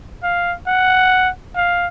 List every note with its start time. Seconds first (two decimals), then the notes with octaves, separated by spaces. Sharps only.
0.23 F5
0.67 F#5
1.56 F5